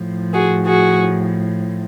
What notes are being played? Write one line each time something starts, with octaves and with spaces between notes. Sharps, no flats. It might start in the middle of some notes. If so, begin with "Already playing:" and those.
Already playing: A2 F3
F#4 G#4
F#4 G#4